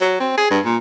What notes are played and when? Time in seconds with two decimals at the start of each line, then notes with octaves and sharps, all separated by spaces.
0.01 F#3
0.20 C4
0.37 G#4
0.50 G2
0.65 A#2